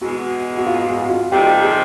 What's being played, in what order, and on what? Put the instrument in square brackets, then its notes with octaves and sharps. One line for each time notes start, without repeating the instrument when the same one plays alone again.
[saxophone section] E2 B2 G#3 [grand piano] F#4
[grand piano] F#4
F4
F#4
F4
[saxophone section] F2 C3 D#3 G3 C4 [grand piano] G4
[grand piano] G#4